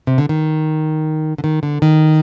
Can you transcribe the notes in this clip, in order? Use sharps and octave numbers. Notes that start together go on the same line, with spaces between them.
C3
D3
D#3
D3
D#3
D3
D#3